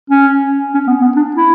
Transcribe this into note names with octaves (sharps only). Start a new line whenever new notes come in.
C#4
C#4
B3
B3
D4
E4